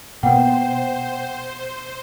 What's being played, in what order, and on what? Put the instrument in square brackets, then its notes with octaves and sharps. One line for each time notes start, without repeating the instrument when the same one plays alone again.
[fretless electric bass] B2 [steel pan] A#3 B3 [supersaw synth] C5 [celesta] F#5 G5